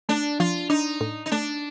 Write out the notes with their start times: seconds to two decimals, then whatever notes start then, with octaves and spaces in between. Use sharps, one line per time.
0.09 A3 D4
0.40 F3 F4
0.70 D4 D#4
1.01 A2
1.26 D#4
1.32 A3 D4